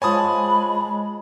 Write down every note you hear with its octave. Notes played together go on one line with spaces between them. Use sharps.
G#3 F4 C5 C#5 G#5 A5 B5 D#6